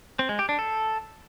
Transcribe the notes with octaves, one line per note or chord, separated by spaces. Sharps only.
C4
G#3
G4
D4
A4